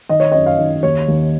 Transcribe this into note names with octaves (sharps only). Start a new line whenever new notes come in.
D#3 D#5
C#5
F#2 D#5
F5
D#3
D#2 C#5
D#2